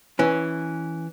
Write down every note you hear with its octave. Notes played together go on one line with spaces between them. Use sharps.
E3 C#4